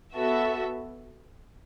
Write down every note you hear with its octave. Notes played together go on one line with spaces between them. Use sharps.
B3 F#4 A4 E5